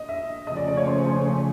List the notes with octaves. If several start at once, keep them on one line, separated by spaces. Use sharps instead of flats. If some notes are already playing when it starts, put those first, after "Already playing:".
Already playing: D#5
E5
C#3 F3 A3 C#4 D#5
D5
D5
C#5
C5
C5
C#5